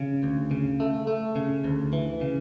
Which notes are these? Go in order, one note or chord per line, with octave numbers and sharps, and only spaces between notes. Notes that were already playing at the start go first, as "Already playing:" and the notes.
Already playing: C#3
D2
C#3
A3
A3
C#3
D2
E3
C#3